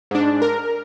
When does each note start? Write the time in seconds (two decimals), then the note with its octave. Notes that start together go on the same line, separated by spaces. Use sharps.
0.11 G#2 D4
0.42 A#4